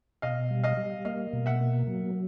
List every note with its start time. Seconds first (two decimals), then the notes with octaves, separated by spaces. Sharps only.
0.22 B2 D#5 F5
0.51 G3
0.64 D#5 F5
0.77 G3
1.05 A#3 D#5 F5
1.33 B2
1.46 E5 F#5
1.61 A#3
1.87 F#3